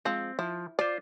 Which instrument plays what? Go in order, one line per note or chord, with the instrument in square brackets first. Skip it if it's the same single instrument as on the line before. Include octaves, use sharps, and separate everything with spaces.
[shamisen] F3 G#3 [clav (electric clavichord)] C4
[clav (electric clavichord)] F3 [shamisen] E4
[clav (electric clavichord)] F4 C5 [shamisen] D5